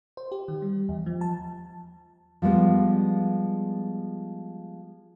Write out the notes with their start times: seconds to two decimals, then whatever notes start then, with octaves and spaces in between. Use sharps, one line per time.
0.17 C5
0.32 G4
0.48 D#3
0.62 G3
0.89 E2
1.06 F3
1.21 A5
2.42 F3 G3 G#3 B3